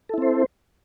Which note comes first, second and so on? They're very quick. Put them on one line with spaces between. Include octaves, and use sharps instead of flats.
A4 E4 C4 C5